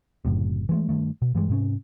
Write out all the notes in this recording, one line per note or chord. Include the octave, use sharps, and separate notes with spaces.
F#1 F#2 A2 C3
E3 G#3 A3
G2 D#3 A3
B2
G2 E3 G3 G#3
G#2 C3 C4 C#4